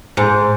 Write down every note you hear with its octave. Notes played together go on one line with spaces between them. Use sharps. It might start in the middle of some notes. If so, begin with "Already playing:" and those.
G#2